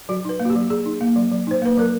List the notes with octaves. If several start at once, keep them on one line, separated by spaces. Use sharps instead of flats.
F#3 F#4
D#4 B4
A#3
F#4
G4
F#3
F#3 G#4
D#4
A#3
F#3
F#3
D#4 C5
A#3 B4
F#3 A#4